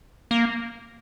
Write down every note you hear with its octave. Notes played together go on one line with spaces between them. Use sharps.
A#3